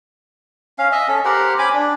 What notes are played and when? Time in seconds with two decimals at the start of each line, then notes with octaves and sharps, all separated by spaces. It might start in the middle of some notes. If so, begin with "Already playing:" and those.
0.79 C#4 F5
0.92 D#5 E5
1.08 C#4 A4
1.25 G4 A#4 C5 F#5
1.59 C#4 G#5 B5 D6
1.73 D4